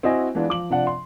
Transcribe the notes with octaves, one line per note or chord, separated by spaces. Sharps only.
C4 E4 F#4 D#5 G#5
E3 G#3 B3 D4 F4
F3 D6 F#7
C3 F3 D4 F#5
C6